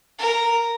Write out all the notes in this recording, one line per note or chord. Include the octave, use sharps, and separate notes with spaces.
A#4